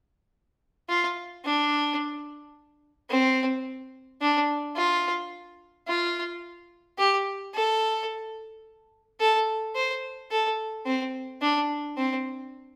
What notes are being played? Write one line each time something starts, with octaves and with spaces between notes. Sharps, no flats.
F4
D4
C4
D4
F4
F4
G4
A4
A4
C5
A4
C4
D4
C4